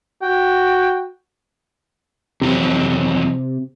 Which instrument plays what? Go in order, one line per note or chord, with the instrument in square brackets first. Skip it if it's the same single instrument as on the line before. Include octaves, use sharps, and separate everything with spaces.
[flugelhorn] F#4 [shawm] G5
[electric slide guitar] F2 E3 F#3 [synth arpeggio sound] C3